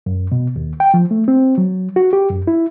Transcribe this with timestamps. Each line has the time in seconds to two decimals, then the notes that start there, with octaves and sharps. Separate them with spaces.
0.06 F#2
0.32 B2
0.56 D#2
0.80 G5
0.94 F3
1.11 A3
1.28 C4
1.58 F#3
1.96 F#4
2.13 G4
2.30 F#2
2.47 E4